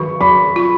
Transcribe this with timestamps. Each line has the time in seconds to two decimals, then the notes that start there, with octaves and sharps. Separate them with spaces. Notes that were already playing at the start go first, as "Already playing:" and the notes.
Already playing: D#3 C#6
0.21 F#3 B5
0.56 F4